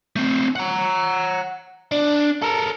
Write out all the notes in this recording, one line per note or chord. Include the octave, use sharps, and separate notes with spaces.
A3 C4
F#5 A#5
D4
A4 A#4